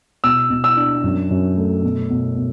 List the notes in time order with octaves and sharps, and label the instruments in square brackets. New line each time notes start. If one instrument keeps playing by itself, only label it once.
[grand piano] B2 E6
B2
E6
D4
F#2
F#2
A3
B2
B2
B2